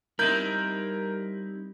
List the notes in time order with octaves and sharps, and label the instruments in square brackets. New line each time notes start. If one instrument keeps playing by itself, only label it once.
[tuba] G3 [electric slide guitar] C4 D#4 E4 [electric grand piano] A#4 G6